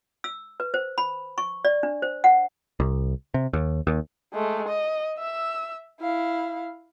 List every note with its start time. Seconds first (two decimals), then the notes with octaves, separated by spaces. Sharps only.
0.24 E6
0.60 B4
0.74 C5
0.98 B5
1.38 C#6
1.65 D5
1.83 D4
2.02 C5
2.24 F#5
2.80 C2
3.34 C3
3.53 D#2
3.87 D#2
4.34 G#3 A3
4.68 D#5
5.18 E5 E6
6.01 E4 F5